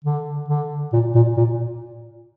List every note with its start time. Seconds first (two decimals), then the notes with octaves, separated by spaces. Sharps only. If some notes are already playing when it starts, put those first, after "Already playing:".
0.05 D3
0.48 D3
0.93 A#2
1.14 A#2
1.37 A#2